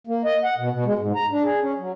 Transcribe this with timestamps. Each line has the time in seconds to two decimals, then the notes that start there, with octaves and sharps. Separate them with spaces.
0.07 A#3
0.25 D#5
0.44 F#5
0.58 B2
0.73 B2
0.85 G#3
0.98 G#2
1.16 A#5
1.31 D4
1.43 G#4
1.61 C#4
1.79 F#3